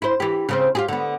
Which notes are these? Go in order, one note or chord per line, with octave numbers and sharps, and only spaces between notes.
E4 C5
E3 G4
C#3 C4 C5
F4 G4 G#4
D3 B3